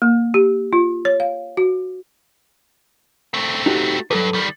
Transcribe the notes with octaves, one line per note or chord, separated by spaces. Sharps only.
A#3
G4
F4
C#5
F5
F#4
A3 C4
D#4 F#4 G4
E2 G2 F#3 A4 B4
D#3 G3